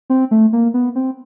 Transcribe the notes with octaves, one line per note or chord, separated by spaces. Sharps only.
C4
A3
A#3
B3
C4